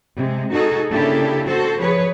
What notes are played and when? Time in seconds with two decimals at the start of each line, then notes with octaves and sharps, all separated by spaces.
0.17 C3 G#3
0.53 D#4 F#4 G#4 A4
0.91 C#3 A#3 D4 E4 G4 A4
1.45 F#4 A4 C5
1.79 F3 G#4 B4 C#5